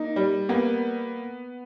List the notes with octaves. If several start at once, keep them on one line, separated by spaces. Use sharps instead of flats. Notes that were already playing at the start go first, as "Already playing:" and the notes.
Already playing: A#3 D#4
G3
A#3 B3